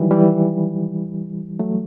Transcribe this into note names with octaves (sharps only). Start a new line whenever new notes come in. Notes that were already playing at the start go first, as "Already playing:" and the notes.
Already playing: D#3 E3 F#3 G3
E3 G3
F#3 A3